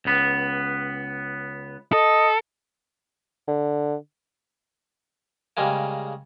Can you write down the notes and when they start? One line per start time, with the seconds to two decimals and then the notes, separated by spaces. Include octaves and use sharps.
0.05 C#2 B3
1.92 A4 D#5
3.48 D3
5.57 C#3 G3 G#3 A#3